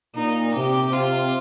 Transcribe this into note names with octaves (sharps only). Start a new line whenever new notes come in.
A#2 D#4
C3 G4
C3 F4